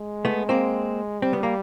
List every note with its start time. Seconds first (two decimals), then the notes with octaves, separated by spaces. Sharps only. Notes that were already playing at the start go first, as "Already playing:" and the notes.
Already playing: G#3
0.25 A3 B3
0.49 A#3 C4
1.22 G3 C4
1.33 B3
1.43 A#3